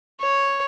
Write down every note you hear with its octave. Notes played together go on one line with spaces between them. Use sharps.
C#5